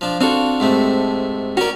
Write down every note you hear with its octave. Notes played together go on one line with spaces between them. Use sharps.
F3 D4
C4 D4 F4 F#4 A4
G#2 C3 A3
C#4 F#4 A#4 D5